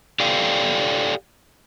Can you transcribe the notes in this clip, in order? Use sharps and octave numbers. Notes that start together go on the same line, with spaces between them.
G4 A4 D5 F5 G5